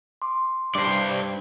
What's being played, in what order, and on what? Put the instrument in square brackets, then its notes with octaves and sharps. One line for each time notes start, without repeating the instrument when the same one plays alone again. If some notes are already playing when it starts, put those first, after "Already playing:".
[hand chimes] C6 D6
[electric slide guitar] G2 [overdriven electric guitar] C5 D5